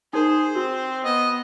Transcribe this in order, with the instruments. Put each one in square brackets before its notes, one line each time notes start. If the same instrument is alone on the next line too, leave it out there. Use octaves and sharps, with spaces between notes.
[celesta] D#4 A#4 [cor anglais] G#4 [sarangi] C5
[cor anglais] C4 [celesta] F#4
[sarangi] B3 [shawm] D#5